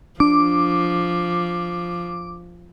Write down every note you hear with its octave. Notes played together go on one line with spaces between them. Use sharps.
F3 D4 D6